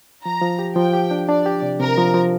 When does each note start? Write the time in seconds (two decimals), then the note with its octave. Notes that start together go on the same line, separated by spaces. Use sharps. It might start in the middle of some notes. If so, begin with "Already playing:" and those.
0.24 F3 A#5
0.42 F3
0.59 G4
0.76 F3 G5
0.93 G4
1.11 D4
1.28 D4 D5
1.46 G4
1.62 C3
1.80 C3 A#4
1.97 F3
2.14 F3